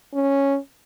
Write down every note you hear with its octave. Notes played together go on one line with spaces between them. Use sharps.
C#4